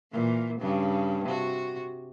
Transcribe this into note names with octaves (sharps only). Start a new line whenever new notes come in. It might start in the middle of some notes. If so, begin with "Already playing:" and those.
A#2 E3
G2 C#3
C3 F#4